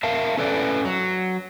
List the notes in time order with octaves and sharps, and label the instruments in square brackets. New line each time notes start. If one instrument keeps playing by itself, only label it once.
[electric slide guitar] A#4 E5 F5 A5
C#4 A4 B4 D5
F#3